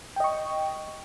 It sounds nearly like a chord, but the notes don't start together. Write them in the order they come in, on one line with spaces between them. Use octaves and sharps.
G5 D#5 C#6